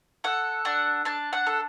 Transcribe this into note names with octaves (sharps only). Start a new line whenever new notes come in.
A4 F#5
D4 F#5
D4 A5
F#5
A4